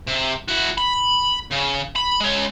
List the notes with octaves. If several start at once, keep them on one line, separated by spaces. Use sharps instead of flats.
C3
E4 F#4
B5
C#3
B5
G#3 C#5